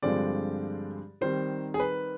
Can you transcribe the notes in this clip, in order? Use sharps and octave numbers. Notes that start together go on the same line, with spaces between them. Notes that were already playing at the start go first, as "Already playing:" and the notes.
G2 D3 F3 G#3 C4 D5
D#3 G3 C4 D#4 C5
G#4
B4